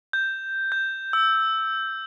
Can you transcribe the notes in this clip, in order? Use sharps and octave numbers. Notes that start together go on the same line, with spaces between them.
G6
G6
E6